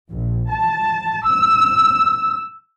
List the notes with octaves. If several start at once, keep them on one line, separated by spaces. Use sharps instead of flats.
A#1
A5
E6